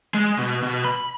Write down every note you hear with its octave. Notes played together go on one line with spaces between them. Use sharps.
G#3
B2
B2
B5